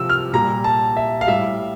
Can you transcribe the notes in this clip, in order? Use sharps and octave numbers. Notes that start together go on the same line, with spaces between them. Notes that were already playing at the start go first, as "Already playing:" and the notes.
Already playing: C3 F3 E6
F6
A#2 G3 A#5
A5
E5
F5
A2 G3 E5